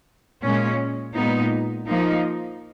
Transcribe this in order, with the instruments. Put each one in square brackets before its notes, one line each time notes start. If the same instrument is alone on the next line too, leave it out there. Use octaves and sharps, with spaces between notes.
[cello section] A#2 G#3 C#4
A#2 G#3 B3 D#4
F3 A#3 D#4